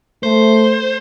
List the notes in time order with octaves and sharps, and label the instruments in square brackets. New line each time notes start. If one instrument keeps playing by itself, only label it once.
[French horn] A3 [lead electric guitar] C5